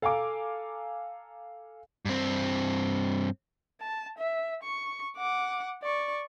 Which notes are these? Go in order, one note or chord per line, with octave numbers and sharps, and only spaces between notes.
A4 F5 G#5 A#5 D6
G2 C4
A5
E5
C#6
F#5 D6
D5 C#6